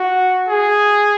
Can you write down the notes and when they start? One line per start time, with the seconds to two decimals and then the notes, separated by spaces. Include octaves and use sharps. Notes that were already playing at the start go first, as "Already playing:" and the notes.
Already playing: F#4
0.48 G#4